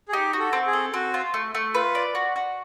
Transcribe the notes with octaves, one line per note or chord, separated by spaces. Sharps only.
G#4
D#4 G4
F#4
A4
C4
G#4
A4
C4 F#4
F4
A3
A3
F4 B4
D5
F#4
F#4